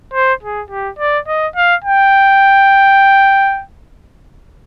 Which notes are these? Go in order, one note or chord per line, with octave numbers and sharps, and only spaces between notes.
C5
G#4
G4
D5
D#5
F5
G5